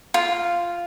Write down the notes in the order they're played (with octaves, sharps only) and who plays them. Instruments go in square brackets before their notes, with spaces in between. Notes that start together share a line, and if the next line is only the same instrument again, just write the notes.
[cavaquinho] F4